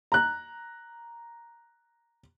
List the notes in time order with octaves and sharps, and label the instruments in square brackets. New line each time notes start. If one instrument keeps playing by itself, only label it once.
[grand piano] A#5 F#6